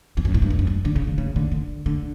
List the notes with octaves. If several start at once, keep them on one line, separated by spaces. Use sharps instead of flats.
E2
F#2
A2
G2
E2
F#2
G2
D3
C#3
D3
C#3
D3
D3
D3